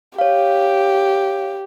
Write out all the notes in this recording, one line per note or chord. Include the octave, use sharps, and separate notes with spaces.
G4 C#5 F5